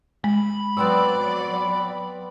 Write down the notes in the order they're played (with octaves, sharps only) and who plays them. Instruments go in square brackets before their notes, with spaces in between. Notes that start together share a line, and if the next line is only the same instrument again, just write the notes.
[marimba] G#3 [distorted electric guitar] B5
[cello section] F#3 D5 [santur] B3 C4 E6